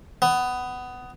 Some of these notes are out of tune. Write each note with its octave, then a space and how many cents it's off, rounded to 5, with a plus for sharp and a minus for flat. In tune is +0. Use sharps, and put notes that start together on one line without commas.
B3 +15